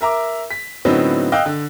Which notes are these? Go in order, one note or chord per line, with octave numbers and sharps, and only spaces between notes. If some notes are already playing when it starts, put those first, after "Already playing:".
A#4 E5 A#5 D6
B6
A2 D3 F#3 B3 C4 D#4
D#5 F5 G5 E6 F#6
D3